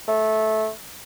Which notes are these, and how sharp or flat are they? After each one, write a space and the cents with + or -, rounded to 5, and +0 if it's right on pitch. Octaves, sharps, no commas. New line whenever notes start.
A3 -15